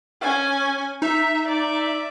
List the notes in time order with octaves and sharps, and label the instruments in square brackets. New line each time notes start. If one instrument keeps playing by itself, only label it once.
[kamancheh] C#4 G#5
[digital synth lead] D#4 [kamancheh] E5
[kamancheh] D5 E5